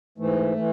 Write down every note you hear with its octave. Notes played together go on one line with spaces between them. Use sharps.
G#2 E3 A3
E3